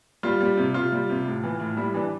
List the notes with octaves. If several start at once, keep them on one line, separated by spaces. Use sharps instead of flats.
G3 F4
G3
C3
C3 F4
G3
C3
A2
E3
A2
G3 E4
E3 D4